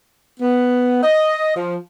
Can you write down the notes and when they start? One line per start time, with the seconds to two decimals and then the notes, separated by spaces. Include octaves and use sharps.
0.40 B3
1.03 D#5
1.56 F3